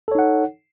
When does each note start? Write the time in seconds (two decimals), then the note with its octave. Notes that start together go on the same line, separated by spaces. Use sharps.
0.08 A4
0.12 C#5
0.15 D#4
0.19 F#5